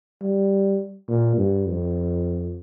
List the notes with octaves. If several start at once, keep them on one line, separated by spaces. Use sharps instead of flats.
G3
A#2
G2
F2